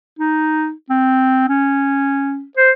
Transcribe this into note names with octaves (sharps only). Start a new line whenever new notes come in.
D#4
C4
C#4
C5